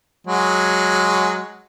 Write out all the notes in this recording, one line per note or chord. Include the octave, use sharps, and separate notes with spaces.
F#3 G#3